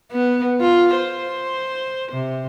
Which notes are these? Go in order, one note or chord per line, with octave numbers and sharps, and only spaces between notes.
B3
F4
C5
C3